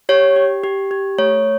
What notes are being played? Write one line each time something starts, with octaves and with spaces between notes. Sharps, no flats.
G4 C#5
G4
G4
G4
A3 C#5